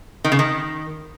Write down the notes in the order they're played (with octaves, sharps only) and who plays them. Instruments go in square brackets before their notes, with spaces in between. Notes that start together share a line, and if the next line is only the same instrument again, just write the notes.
[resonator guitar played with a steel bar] D#3
C#3
D#3